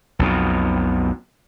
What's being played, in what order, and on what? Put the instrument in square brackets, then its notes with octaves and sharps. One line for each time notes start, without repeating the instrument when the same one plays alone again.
[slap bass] B1 F2 B2